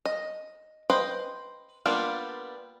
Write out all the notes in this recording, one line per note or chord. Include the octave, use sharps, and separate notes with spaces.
D#5
B4 C5 D#5 G5
G3 A#3 B3 D4 F4